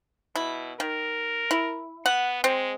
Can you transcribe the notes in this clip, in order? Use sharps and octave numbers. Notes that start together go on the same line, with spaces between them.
B2 E4
D#3 A#4
E4
B3 F#5
G#3 C4